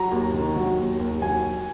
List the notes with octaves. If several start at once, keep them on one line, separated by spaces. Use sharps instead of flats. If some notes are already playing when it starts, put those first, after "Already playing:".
Already playing: F#3 A#5
D#2
D#3
F#3
D#2
D#2
F#3 G#5